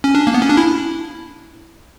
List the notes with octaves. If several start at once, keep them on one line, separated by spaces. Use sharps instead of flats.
C#4
D4
A#3
B3
C#4
D4
E4